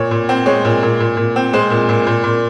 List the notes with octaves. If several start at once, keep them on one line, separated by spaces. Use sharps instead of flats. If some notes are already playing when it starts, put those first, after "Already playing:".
Already playing: A#2 C#5
A#2
C4
G#3 C#5
A#2
A#2
A#2
A#2
C4
G#3 C5
A#2
A#2
A#2
A#2